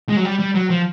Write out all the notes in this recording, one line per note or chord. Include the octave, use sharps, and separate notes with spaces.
G#3
F#3
G3
G3
F#3
F3